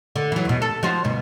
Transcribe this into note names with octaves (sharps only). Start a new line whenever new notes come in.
D3
E3 F#3
E2 B2
A4
F3 F#4 C5
D2 G2 B2